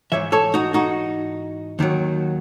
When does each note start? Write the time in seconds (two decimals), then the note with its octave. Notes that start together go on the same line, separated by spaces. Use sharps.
0.12 G#2 E3 C#5 E5
0.32 A4 C#5
0.54 D#4 F#4
0.74 D#4 F#4
1.79 D#2 D#3 F#3